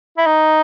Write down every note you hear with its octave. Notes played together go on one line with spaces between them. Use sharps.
E4
D#4